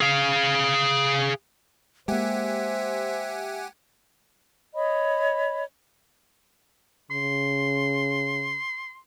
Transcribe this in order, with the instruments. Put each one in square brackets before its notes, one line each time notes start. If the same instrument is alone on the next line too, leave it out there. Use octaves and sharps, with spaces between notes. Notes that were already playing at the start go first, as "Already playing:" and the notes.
[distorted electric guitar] G#4 F5
[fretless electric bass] G#3 A#3 [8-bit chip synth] G4 F#5 G#5 [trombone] C5 [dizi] E5
[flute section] C#5 D#5 B5
[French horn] C#3 [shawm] C6